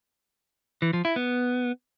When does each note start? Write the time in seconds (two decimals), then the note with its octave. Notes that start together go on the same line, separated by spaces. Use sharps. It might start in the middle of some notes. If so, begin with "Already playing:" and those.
0.82 E3
0.93 F3
1.05 E4
1.16 B3